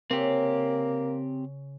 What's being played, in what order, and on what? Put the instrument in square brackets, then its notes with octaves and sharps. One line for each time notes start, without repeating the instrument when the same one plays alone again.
[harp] C#3 [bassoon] A#3 [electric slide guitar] C4 G4